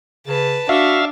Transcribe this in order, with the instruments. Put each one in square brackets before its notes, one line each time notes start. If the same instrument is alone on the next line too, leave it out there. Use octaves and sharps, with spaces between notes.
[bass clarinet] C#3 [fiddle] B4 A5
[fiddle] D4 [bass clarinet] F#4 [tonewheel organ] E5 F5